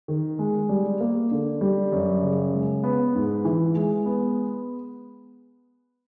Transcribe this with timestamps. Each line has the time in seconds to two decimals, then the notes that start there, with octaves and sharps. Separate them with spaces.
0.08 D#3
0.39 G#3
0.69 G3
1.01 A#3
1.31 D3
1.61 G3
1.92 F#2
2.22 C#3
2.54 G#3
2.84 B3
3.15 G#2
3.45 E3
3.76 G#3
4.06 B3